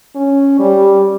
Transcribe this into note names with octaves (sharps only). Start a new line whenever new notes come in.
C#4
G3